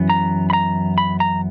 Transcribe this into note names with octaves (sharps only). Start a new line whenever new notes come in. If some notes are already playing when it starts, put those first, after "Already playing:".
Already playing: F#2 E3 B3
A#5
B5
A#5
B5
A#5